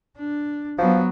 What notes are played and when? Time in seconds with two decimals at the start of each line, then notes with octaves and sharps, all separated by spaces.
0.18 D4
0.78 F3 F#3 B3